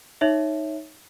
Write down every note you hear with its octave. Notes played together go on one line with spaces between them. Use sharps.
D#4 C#5 E5